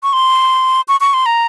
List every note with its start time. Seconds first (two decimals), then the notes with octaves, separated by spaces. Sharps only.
0.03 C#6
0.13 C6
0.88 C#6
1.01 C#6
1.14 C6
1.26 A#5